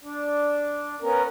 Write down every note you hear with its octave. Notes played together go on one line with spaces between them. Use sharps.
D4
B3 C#4 A#4